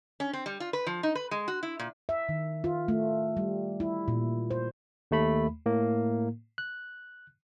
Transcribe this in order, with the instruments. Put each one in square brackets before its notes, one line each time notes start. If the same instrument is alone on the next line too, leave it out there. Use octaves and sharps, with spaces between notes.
[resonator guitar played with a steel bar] C#4
C4
G3
F4
B4
F3
D#4
B4
G#3
F#4
E4
A#2
[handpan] E5
D#3
F4
A3
G3
E4
A#2
C5
[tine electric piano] D#2 A3 B5
A2 A#3
F#6